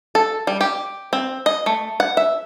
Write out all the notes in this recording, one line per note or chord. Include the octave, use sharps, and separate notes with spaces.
A4
G3
G4
C4
D#5
A3
F#5
E5